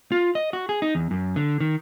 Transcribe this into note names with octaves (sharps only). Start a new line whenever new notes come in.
F4
D#5
F#4
G#4
D#4
E2
F#2
D3
D#3